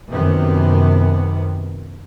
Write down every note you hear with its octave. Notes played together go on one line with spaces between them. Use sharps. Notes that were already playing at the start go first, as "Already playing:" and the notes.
F#2 C3 D#3 B3